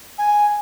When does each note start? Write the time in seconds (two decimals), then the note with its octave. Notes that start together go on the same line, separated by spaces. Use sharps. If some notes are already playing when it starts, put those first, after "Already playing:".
0.18 G#5